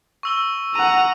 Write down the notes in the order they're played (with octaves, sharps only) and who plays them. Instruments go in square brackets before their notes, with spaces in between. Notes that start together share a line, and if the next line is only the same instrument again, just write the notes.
[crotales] C#6 E6 G7
[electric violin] F#5 A#5 [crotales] D#7